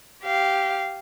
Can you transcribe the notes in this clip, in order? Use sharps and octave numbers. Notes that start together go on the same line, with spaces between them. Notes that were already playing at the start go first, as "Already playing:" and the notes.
G4 F5